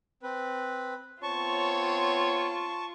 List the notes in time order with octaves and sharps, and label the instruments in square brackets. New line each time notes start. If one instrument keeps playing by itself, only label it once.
[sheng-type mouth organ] C4 B4
[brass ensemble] B3 C4 C#5 [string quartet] F4 [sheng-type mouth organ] A5 C#6